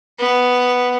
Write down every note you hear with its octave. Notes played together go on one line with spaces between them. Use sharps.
B3